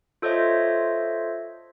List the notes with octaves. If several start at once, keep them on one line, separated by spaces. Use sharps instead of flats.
F4 A4 C5 C#5 D#5 E5